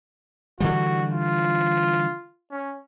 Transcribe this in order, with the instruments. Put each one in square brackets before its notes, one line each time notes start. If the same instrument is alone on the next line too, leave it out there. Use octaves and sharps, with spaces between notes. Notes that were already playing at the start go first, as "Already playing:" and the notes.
[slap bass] D3 E3 G3 [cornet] F#4
[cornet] F4
C#4